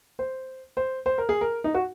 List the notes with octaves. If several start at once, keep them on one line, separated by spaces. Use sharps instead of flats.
C5
C5
C5
A#4
G#4
A#4
D#4
F#4